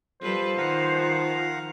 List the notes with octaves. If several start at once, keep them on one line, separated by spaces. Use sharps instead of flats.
F3 G3 A4 B4 C5
D#3 F5 F#5 A#5